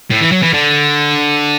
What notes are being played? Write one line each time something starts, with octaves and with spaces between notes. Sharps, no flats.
A2
E3
F#3
E3
D3